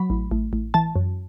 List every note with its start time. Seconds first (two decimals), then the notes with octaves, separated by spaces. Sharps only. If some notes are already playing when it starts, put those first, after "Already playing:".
Already playing: F#3 B5
0.10 A1
0.31 A1
0.53 A1
0.74 E3 A5
0.96 F#2